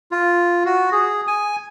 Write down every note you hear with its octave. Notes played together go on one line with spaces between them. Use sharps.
F4
F#4
G#4
G#5